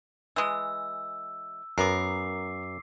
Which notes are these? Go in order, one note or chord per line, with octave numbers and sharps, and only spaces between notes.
E3 G#3 E6
F#2 B3 A#4 D6 C7